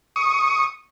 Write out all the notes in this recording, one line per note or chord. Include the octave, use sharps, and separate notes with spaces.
C#6 D#6